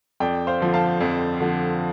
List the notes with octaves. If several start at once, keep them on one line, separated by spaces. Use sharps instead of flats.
F2 D5 G5
C5 F5
D3 F3
F5 A5
F2
D3 F3